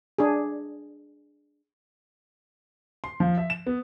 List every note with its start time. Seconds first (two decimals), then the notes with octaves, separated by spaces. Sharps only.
0.18 D4 G#4
3.04 C6
3.20 F3
3.37 E5
3.50 E7
3.66 B3